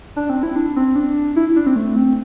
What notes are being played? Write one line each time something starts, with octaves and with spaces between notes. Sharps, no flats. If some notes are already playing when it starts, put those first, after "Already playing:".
D4
C4
E4
D4
C4
D4
E4
D4
C4
A3
C4